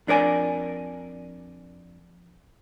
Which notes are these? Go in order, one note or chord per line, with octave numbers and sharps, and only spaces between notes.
F2 D4 A#4 D5 G#5